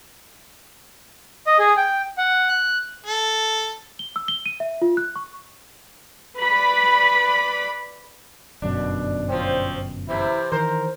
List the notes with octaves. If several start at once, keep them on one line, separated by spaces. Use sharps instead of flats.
D#5
G#4
G5
F#5
F#6
A4
G7
E6
G7
D#7
E5
F4
F#6
C#6
B4 D5 B5
G1 F#2 B2 D4
F3 C4 C#4
C3 E3 C4 E4
D#3 E3 A#4 C5